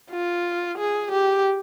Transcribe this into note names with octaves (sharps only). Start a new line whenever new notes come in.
F4
G#4
G4